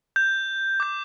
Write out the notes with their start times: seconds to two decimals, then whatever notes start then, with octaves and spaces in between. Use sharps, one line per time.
0.16 G6
0.80 D6 G6